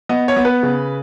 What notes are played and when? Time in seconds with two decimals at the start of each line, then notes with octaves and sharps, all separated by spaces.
0.09 B3 D#5
0.28 C#5
0.36 B3
0.45 B4
0.63 C#3